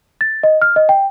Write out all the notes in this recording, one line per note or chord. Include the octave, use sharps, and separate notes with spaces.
A6
D#5
F6
D#5
G5